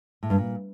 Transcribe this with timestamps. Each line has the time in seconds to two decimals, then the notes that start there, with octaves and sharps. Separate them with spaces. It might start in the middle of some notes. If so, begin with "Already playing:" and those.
0.23 A2
0.30 G2
0.38 A#2